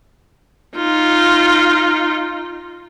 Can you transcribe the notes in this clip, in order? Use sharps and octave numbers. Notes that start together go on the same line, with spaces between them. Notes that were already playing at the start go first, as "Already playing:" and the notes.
D#4 F4